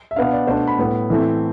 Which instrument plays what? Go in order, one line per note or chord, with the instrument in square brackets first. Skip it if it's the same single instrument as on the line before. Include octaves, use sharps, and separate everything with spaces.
[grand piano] E5
B2 B3 D4 F5
D5
B2 A3 D4 C5
B5
A2 G3 B3
A2 E3 A3 C4